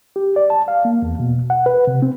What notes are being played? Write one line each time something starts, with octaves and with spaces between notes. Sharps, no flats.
G4
D5
A5
F5
A#3
E2
B2
F#5
B4
C3
C4